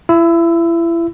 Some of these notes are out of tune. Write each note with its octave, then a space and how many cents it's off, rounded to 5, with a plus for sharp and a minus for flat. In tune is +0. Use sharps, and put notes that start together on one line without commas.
E4 +30 E6 +0